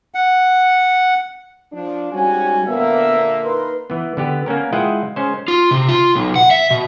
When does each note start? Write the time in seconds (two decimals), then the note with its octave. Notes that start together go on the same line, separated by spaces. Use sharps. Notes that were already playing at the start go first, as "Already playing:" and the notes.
0.14 F#5
1.72 F3 D4
2.12 G#2 G3 C#4 F#4 G#5
2.67 A#2 D3 A#3 B3 E5
3.44 D#4 A#4 B4 C6
3.90 E3 B3
4.17 D3 B3 G4
4.46 A#3 B3 C#4 A#4
4.73 G#3 E4 F4 D#5 F#5 G5
5.16 G#3 C#4 C5
5.48 F4
5.71 C3
5.89 F4
6.15 B1
6.36 F#5
6.51 E5
6.71 B2